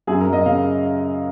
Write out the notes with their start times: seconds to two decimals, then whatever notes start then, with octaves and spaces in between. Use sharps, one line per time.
0.07 F#2 G#4
0.21 A#4
0.27 F#2
0.33 D#5
0.46 C#3 F5